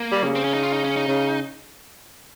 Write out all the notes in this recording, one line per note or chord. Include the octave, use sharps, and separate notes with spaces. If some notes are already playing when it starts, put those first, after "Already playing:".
Already playing: A#3
G3
C#3
C4
C#4
D#4
F4
D#4
C#4
D#4
C#3